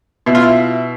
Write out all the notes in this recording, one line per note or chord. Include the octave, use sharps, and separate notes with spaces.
B2 E4
F4
E4